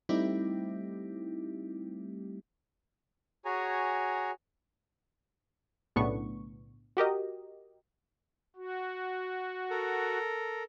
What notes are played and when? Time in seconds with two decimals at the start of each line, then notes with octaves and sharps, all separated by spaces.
0.09 G3 A3 C4 D#4 E4 G4
3.45 F#4 G#4 C#5 G#5 A#5
5.96 B1 A2 C#3 B3 D4 C#6
6.97 F#4 G4 A#4 D#5
8.56 F#4
9.70 A4 A#4